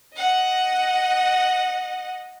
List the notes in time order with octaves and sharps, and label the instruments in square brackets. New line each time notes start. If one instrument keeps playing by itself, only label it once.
[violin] D#5 F#5